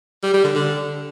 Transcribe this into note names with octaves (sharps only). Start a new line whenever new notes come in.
G3
G3
D3
D3